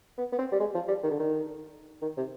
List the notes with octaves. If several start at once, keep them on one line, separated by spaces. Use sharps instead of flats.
B3
B3
C4
G3
G#3
F3
G3
D#3
D3
D#3
D#3
C3